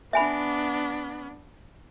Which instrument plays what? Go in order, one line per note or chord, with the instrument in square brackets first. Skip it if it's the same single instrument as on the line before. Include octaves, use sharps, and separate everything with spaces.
[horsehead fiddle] B3 D4 [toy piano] E5 G#5 B5